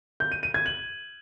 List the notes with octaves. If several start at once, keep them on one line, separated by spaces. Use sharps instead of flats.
G6
D#7
D#7
G#6
F#7